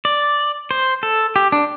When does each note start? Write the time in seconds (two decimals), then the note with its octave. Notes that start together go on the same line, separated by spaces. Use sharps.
0.05 D5
0.71 C5
1.03 A4
1.36 G4
1.52 D4